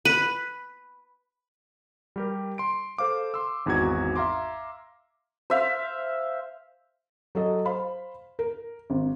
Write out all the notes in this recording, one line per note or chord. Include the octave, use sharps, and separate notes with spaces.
B4 D#7
G3 G4 A#4
C6 D7
A4 C5 F5 D6
C6 E6
G#1 E2 D#4 F#4 G#6
E5 F5 A#5 C6 D6
C5 E5 F5
F#3 A4 D#5
C5 F5 B5
A#4
G#1